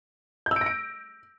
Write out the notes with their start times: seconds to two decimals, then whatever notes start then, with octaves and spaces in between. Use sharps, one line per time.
0.46 G6
0.51 E6
0.56 D7
0.61 A#6
0.66 D7